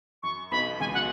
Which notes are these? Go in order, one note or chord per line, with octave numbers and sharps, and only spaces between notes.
F#2 C#6
B1 B2 B5
C#2 C#3 G#5
F#3 F#5